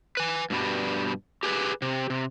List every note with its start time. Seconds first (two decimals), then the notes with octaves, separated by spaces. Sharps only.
0.17 B4 G#5
0.50 G2 B2 G3
1.43 G4 G#4 B4
1.82 C3
2.10 C3